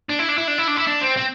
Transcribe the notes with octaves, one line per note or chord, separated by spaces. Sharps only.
D4
E4
D4
E4
D4
E4
D4
E4
D4
C4
C4